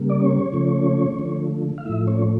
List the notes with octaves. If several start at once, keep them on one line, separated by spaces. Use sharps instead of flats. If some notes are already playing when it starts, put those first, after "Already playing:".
Already playing: C#3 G3 A#3
D5
C#4 C#5
C#3 F3 A3
D3 F3 A3
F5
A2 F3 A3 E4 E5
C#4 C#5